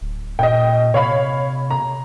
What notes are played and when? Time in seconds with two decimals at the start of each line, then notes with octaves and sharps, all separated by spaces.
0.01 D1
0.39 A#2 D#5 G5
0.94 C3 C#5 F5 B5
1.70 A#5